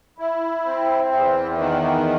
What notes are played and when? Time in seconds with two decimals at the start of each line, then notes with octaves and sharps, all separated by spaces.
0.18 E4
0.65 C4
1.12 E2
1.58 D#3